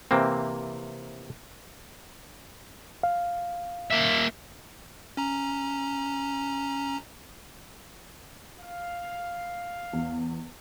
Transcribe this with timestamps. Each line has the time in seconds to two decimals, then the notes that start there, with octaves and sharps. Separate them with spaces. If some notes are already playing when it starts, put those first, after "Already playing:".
0.11 C3 E3 A#3 C4
3.03 F5
3.90 A#3 E5
5.17 C#4 A#5
8.60 F5
9.93 E2